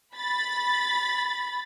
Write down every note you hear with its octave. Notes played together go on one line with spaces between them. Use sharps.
B5 A6